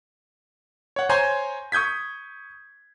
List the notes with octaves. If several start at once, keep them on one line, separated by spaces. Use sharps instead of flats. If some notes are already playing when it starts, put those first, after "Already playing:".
C#5 F#5
C5 C#5 G#5 A#5 C6 G6
C#6 D#6 G6 G#6 B6